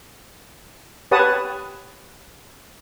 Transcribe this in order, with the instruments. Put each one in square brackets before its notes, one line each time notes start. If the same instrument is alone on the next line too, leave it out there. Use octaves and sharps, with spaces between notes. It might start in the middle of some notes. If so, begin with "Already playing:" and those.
[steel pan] G4 B4 C#5 F#5 A5 D#6